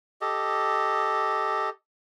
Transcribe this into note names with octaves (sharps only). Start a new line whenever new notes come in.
G4 A4 D#5